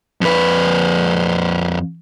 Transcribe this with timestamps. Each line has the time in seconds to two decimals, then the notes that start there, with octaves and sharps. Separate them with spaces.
0.21 F2 B4